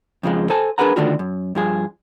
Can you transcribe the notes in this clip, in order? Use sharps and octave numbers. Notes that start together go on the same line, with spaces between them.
F2 C#3 F3 G#3
A4 C5 G#5 A5
D4 G#4 A#4 B4 F#5 A#5
D3 D#3 A3 D4 F4 F#4
F#2
G2 F3 G#4